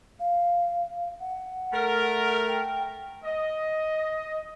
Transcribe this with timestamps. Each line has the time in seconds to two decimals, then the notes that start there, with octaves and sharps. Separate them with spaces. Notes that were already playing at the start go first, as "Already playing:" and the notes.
0.20 F5
1.20 F#5
1.73 A3 A#4
2.48 G5
3.24 D#5